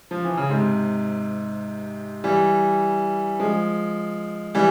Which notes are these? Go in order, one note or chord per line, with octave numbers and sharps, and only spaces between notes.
F3
E3
C#3
G#2 C3
E3 G3
F3 G#3
E3 G3